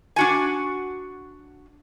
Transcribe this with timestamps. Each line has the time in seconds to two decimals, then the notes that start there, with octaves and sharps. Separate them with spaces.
0.16 D4 F#4 G#5